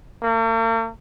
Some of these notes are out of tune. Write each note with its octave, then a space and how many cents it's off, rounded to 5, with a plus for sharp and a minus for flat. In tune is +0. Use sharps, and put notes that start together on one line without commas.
A#3 -45